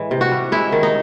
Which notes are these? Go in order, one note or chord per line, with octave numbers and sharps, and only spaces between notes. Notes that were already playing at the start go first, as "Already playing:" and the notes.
Already playing: A2 E3 G#3
C3
F#4
G3
G#3 E4
D#3
D#4